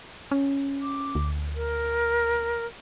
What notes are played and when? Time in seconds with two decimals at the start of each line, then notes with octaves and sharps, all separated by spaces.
0.31 C#4
0.82 D6
1.15 D2
1.56 A#4